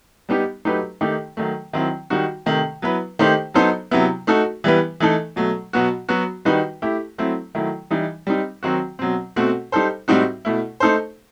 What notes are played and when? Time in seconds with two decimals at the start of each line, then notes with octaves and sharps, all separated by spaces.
0.29 G3 B3 D#4 G4
0.65 F#3 A3 D#4 G4 B4
1.01 D#3 A3 D#4 G4
1.37 D#3 F#3 A3
1.73 D#3 F#3 C4 E4
2.10 D#3 G3 D#4 F#4
2.46 C3 D#3 A3
2.82 F#3 B3 E4 B4
3.19 D#3 A3 D#4 G4 C5
3.54 F#3 B3 D#4 A4 C5
3.91 C3 F#3 B3 E4
4.27 A3 D#4 F#4 A4
4.64 E3 G3 B3 E4 B4
5.00 E3 A3 D#4 A4
5.36 B2 F#3 A3
5.73 B2 F#3 B3 F#4
6.09 F#3 B3 F#4
6.45 D#3 G3 D#4 F#4 B4
6.82 A3 E4 G4
7.18 F#3 A3 C4 E4
7.55 D#3 F#3 A3 E4
7.90 E3 G3 D#4
8.27 G3 C4 D#4
8.63 D#3 F#3 C4 F#4
8.99 B2 F#3 C4
9.36 B2 A3 C4 F#4
9.72 G3 D#4 A4 C5
10.08 A2 G3 C4 D#4 F#4
10.45 B2 A3 E4
10.80 A3 D#4 A4 C5